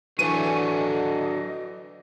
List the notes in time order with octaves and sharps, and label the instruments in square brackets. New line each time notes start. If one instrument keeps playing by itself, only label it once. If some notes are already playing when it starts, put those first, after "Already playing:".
[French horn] D3 [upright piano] E3 D#7 [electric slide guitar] F#3 D4 [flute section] E5 G#5 C#6
[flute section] D#5